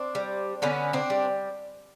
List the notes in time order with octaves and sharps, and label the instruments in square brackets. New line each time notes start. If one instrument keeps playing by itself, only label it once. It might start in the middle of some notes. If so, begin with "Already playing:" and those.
Already playing: [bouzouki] C4 D4
G3
D3 B3 C#4
C4 D4
G3